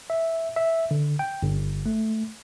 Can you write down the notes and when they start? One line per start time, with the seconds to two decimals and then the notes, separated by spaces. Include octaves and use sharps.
0.10 E5
0.56 E5
0.91 D3
1.19 G5
1.43 G1
1.86 A3